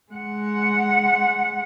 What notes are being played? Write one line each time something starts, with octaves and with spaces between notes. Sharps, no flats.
G#3 F#5